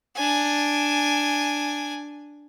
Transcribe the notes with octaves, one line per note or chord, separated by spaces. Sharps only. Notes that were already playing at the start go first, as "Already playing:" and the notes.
D4 G#5